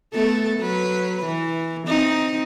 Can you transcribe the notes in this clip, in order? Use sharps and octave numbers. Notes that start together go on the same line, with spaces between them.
A3 B3 A4
F#3 B4
E3
C4 D#4